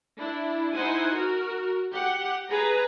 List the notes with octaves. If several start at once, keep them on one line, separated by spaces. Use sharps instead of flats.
D4 E4
D#4 E4 C5 F#5 G#5
F#4 A#4
G4 F#5
G#4 B4 A#5